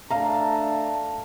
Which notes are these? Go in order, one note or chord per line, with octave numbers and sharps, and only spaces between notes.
A3 D4 F5 A5 A#5